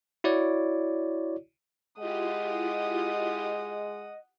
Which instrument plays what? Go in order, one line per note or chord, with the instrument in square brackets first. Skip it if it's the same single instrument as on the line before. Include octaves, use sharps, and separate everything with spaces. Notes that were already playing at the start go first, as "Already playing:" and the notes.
[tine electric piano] E4 F#4 C#5 D5
[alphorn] G#3 [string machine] E4 F4 G4 [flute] D#5 [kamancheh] F#5 D#6